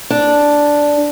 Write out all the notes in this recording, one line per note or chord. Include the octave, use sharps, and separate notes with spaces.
D4